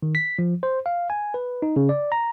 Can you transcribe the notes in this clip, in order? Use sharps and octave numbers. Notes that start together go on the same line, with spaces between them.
D#3
B6
F3
C5
F5
G#5
B4
D#4
C#3
D5
A#5